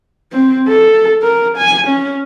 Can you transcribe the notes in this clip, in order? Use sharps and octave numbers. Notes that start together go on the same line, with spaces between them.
C4
A4
A#4
G#5
C#4